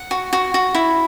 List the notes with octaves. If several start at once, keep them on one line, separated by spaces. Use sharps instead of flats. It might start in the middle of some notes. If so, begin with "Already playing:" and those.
Already playing: F#5
F#4
F#4
F#4
E4